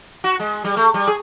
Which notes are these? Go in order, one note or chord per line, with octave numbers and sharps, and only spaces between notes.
F#4
G#3
G3
A3
G3
G#4